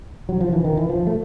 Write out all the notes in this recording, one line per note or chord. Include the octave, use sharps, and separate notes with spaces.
F#3
F3
E3
D#3
E3
F3
A3